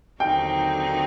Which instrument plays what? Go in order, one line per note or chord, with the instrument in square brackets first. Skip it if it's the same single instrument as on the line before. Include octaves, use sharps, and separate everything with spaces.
[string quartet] D#2 D3 F#3 C4 D#4 [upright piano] G5